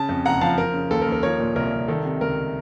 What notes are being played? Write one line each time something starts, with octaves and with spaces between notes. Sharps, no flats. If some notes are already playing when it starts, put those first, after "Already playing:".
Already playing: C#3 A5
F2
F#1 F#5 A#5
F3 F5 A5
F3 A#4
C#3
D#2 A4
A#4
D#2
A#4
F3 A#4 C#5
A#2
C2 A#4
C2
D#3 A4
C3
C#2 A#4